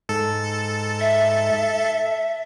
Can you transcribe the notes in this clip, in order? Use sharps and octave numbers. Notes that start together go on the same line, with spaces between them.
G#2 A4
E5